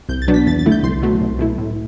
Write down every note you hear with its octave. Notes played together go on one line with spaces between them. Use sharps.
C2 G6
A6
B2 F#3 B3 D4
B6
E2 A6
A6
D3 A3 E4
G6
C2 C6
B2 F#3 A3
C2
B2 A3 E4
A2